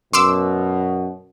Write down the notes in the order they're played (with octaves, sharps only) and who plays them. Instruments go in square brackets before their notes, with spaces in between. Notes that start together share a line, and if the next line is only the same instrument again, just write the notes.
[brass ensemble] F#2 B2 [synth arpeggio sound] C6 D6 E6